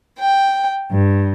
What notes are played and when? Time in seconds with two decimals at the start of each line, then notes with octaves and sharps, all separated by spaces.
0.20 G5
0.89 G2